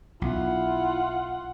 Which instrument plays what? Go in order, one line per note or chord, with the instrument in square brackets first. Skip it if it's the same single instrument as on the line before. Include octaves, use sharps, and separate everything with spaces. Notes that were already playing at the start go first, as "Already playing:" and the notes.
[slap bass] B1 [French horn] E4 [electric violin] F4 F#5